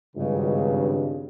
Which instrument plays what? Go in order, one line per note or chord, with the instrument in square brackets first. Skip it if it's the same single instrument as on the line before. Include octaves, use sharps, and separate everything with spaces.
[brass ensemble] G#1 C#2 G2 [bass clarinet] C#3